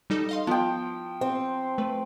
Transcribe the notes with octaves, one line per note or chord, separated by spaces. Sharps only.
G3 D#4 A4
D#5 F5 C6
F3 B3 G5
C4
A3 B4